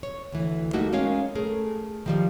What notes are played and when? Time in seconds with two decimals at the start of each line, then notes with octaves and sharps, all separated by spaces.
0.03 C#5
0.32 D2 E3
0.73 G3 A3 A#3 D#4 F#4
0.93 G#3 C#4 A#4 C#5 F5
1.35 A3 G#4 A#4
2.06 D#3 F3 G3